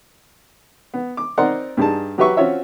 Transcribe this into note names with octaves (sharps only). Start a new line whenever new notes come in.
B3
D6
C4 D#4 A#4 D5 F#5 C6
G2 G3 D#4 G#4 A5
F#3 F#4 G4 B4 E5 C#6
C4 C#4 F4 F#4 C#5 E5